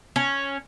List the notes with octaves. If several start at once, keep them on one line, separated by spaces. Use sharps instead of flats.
C#4